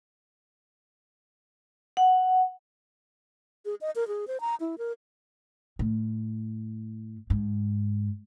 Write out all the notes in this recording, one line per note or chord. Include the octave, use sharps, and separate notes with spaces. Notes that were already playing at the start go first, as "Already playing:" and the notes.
F#5
G#4
D#5
A#4
G#4
C5
A#5
E4
A#4
A2
G#2